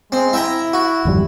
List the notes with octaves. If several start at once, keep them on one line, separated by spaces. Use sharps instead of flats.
G#3 C4
E4 E5 G5 A#5
F#4
G#1 F2 G3